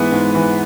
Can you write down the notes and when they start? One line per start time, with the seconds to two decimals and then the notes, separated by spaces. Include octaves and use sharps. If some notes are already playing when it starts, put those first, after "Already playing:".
Already playing: G#2 E3 B3 B4
0.12 G#2
0.35 E3